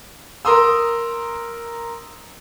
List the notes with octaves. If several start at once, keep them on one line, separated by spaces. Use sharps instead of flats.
A#4 A#5 C6 D#6 E6